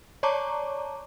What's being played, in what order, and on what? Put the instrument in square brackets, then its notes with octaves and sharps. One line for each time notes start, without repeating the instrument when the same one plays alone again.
[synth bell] C#5 D5 A5 A#5 C#6 D6